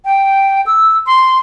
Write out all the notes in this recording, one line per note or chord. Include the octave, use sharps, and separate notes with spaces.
G5
E6
C6